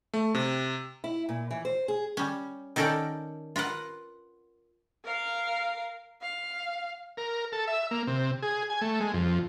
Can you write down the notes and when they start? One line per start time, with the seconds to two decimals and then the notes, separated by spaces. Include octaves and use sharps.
0.14 A3
0.35 C3
1.04 E4
1.29 A#2
1.51 E3
1.65 C5
1.88 G#4
2.17 G3 C#4
2.76 D#3 C#4 A4 A#4 D5 G5
3.56 F4 A#4 B4 F#5
5.05 A#4 F5
6.21 F5
7.17 A#4
7.52 A4
7.67 E5
7.91 A#3
8.07 C3
8.42 G#4
8.70 G#5
8.81 A3
9.00 G#3
9.14 F2